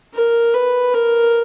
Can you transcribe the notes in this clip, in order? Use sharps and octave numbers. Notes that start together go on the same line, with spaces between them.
A#4
B4
A#4